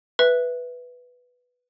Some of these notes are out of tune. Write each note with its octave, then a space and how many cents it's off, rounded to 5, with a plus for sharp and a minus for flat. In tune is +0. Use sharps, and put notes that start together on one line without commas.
B4 +0 E5 +0